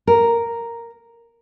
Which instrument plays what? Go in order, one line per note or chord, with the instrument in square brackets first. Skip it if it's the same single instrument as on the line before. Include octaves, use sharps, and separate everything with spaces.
[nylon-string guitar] A#4